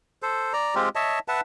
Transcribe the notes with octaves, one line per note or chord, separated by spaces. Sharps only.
A4 C5
D5 A#5
G#3 C4 F4 G4
C#5 D#5 E5 A5
B4 E5 F#5 A5